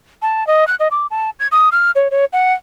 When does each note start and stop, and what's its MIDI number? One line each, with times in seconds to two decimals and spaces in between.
0.22 0.47 81
0.47 0.67 75
0.67 0.75 90
0.80 0.88 75
0.91 1.07 86
1.11 1.30 81
1.40 1.47 92
1.52 1.69 87
1.72 1.91 89
1.95 2.08 73
2.11 2.25 73
2.33 2.53 78